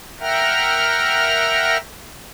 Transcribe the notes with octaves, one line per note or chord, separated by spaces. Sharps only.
A#4 E5 F#5 G5 A#5 F6